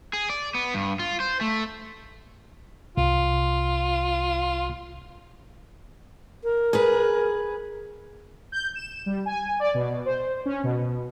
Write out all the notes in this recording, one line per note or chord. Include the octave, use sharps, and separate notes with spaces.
G#4
D5
B3
G2
F4
C5
A3
C2 F4
A#4
G#4 B4
G6
E7
G3
G#5
D5
B2
C5
C#4
B2